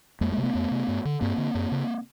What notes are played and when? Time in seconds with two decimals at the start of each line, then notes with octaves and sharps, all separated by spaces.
0.21 F2 G#3 A#3
0.32 G#3 A#3
0.38 C3
0.43 A3 B3
0.55 F2
0.71 C3
0.88 G2
1.05 D3
1.21 G2 A#3 C4
1.38 D3
1.55 F#2
1.72 C#3